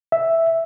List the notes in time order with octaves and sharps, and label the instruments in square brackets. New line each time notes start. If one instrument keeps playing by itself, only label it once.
[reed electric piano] E5